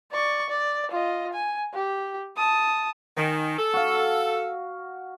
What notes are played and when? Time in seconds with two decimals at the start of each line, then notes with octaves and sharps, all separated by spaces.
0.11 D5 C#6
0.49 D5
0.90 F4 D#5
1.33 G#5
1.74 G4
2.37 A5 D#6
3.17 D#3 G#5
3.59 A4
3.73 F#4 F5